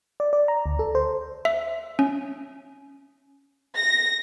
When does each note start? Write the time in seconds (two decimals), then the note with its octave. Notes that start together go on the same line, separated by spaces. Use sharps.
0.20 D5
0.33 D5
0.48 A#5
0.66 D2
0.79 A4
0.95 C5
1.45 E5
1.99 C#4
3.78 A#6